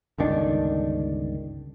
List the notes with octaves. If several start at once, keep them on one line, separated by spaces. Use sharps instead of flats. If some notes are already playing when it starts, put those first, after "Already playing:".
G1 C#2 D#3 D4